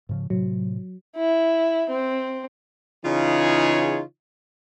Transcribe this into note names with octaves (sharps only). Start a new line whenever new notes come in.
G#2 C#3 F3
A2 C3 F#3
E4
C4
C#3 E3 D#4 F4 G#4 C#5